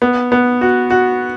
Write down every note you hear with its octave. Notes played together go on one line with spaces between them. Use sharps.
B3
B3
F#4
F#4